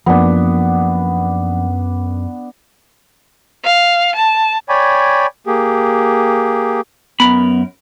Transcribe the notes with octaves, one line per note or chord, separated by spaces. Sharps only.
F#2 F3 A#3 B3 D4
F5
A5
C#5 D5 G5 G#5 B5
A#3 G4 G#4
F#2 B3 A#4 B5